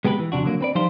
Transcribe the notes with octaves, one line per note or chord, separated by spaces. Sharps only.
G#3 B3 G4 A#4 B4
E3
F2 C3 D4 F#4
D3 F#3 A#3
C4 B4 D5
F3 G3 D#4 C5 F5 C6